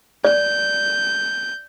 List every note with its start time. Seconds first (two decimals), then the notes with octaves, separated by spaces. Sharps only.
0.25 D5 G6